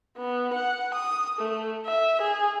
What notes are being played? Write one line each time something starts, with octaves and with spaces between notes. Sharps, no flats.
B3
F#5
D#6
A3
E5
G#4